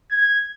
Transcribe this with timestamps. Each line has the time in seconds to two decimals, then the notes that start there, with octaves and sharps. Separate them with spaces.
0.11 G#6